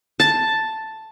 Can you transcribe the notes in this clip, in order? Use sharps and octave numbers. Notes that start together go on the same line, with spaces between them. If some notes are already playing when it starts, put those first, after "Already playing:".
A5